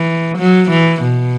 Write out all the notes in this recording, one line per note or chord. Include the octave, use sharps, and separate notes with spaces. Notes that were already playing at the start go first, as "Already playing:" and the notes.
Already playing: E3
F#3
E3
B2